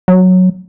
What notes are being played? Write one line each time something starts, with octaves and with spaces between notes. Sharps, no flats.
F#3